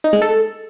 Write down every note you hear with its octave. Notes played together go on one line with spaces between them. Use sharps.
D#4
G#3
A4